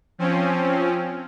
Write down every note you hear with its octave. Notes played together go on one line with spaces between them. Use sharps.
F3 C4 C#4